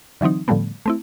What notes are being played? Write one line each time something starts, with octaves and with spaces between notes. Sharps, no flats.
D3 E3 F#3 C4 D#4
A2 D3 F3 G3 A3 B3
A3 C4 E4